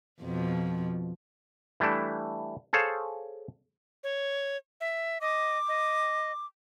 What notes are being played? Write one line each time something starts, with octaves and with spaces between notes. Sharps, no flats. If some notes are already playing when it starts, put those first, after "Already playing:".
F2 B2 F3
E3 G3 A3 D4 E4
G#4 A4 C5 C#5 F5 A5
C#5
E5
D#5 D6
D#5